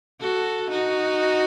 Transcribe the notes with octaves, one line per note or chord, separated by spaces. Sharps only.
F#4 A4
D#4 F#4